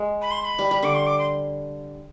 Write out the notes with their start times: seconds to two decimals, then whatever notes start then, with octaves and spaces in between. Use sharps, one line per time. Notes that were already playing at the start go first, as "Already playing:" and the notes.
Already playing: G#3
0.22 B5
0.31 C6
0.41 C6
0.45 B5
0.59 G3
0.71 G3
0.83 D3 D6
0.95 C6
1.07 D6
1.19 C6